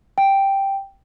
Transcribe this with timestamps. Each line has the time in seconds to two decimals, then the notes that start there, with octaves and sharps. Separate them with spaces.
0.18 G5